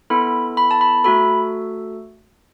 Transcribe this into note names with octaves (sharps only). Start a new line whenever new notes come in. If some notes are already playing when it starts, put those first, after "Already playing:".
B3 E4 A4 B5
B5
A5
B5
A3 F#4 A4 B5